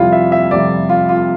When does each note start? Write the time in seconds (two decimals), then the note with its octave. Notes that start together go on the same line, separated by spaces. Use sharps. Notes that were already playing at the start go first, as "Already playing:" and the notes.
Already playing: F2 C3 G3 E4 F4
0.12 E5
0.32 E5
0.51 F2 C3 G3 D5
0.89 F4
1.09 F4